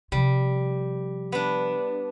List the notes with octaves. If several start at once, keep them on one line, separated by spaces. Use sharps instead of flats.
C3 F3 G3
B3 D4